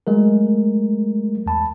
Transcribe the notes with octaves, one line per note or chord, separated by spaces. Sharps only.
F#3 G#3 A3 A#4
E2 A5 B5